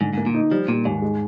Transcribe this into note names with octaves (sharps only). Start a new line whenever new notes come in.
G#2 D3
G#2 A#3
A#2
D#4
F3 G3
A#2 G3
D#2 G#2
G#3